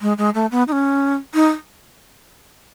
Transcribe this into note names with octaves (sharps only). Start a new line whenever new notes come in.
G#3
G#3
A3
B3
D#4
C#4
D#4